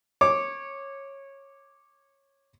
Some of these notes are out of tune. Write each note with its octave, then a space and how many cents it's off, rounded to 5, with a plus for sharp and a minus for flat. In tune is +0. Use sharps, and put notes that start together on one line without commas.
C#5 -15 D6 +0